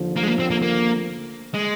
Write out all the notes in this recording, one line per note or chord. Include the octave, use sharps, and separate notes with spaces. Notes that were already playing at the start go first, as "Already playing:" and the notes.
Already playing: D#2 D3 F3
A#3
G#3
A#3
C4
A#3
A#3
G#3